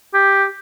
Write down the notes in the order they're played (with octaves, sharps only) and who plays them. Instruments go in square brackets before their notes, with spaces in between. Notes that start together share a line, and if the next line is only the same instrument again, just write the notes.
[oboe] G4